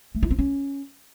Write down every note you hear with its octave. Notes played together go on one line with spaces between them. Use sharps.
A3
E4
C4
C#4